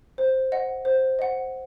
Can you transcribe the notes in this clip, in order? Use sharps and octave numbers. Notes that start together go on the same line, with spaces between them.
C5
D#5 F#5
C5
D#5 F#5